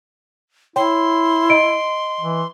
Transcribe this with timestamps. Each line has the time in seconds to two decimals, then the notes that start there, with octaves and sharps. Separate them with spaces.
0.76 E4 C#5 G5 C6
1.50 D#5 D7
2.20 E3